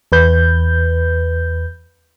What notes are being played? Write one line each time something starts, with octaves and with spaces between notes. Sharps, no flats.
E2 B4 G6